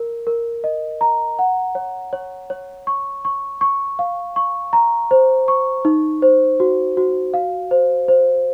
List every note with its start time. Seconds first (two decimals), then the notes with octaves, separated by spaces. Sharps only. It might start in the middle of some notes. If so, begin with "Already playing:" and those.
Already playing: A#4
0.27 A#4
0.64 D#5
1.01 A#5
1.39 F#5
1.75 C#5
2.13 C#5
2.50 C#5
2.87 C#6
3.25 C#6
3.61 C#6
3.99 F5
4.36 C#6
4.73 A#5
5.11 C5
5.48 C#6
5.85 D#4
6.22 C5
6.60 F#4
6.97 F#4
7.34 F5
7.71 C5
8.08 C5